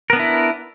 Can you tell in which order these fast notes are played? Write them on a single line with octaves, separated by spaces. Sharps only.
A#4 B3 D4 E4